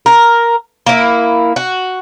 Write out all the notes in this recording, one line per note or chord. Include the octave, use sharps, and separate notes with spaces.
A#4
A#3 E4
F#4